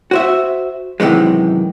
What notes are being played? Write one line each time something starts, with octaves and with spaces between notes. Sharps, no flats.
F#4 C5 E5
F#2 C3 D#3 E3 G#3